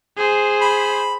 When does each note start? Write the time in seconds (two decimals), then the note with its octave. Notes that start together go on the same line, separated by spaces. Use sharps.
0.17 G#4 C5
0.62 B5